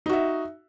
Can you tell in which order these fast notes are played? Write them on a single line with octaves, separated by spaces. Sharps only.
D#4 F#4 E5